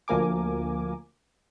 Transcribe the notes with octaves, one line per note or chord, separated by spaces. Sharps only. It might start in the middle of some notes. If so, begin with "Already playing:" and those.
D2 F3 A#3 A#4 G#5 D6